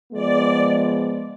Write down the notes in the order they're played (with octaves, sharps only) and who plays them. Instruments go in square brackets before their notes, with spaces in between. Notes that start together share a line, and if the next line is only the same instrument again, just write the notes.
[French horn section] F3 G#3 B3 [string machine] D5